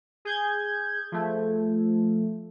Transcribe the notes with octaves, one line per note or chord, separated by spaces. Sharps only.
G#4 G6 G#6
F3 A3